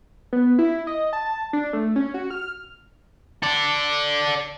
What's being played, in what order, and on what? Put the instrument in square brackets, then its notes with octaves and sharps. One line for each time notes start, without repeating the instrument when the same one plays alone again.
[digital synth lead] B3
E4
D#5
A5
D4
A3
C#4
F#4
F6
[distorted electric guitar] A4 D5